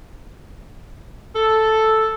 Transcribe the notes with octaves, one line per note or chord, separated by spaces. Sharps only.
A4